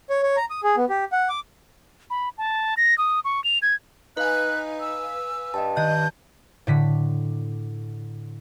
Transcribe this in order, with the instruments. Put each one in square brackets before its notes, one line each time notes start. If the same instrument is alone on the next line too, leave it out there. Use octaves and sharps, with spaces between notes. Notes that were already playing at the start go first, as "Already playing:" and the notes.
[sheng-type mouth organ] C#5
C#5
A#5
D#6
G#4
B3
G4
F#5
D6
[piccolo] B5
A5
A#6
D#6
C#6
F7
G#6
[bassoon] D#4 [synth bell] B4 F5 G#5 [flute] F#6
[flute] E6
[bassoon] G2 [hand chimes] D#5 G5 A5
[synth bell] D#3 D#5 F#6 [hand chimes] A5 [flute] G6
[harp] A2 D3 B6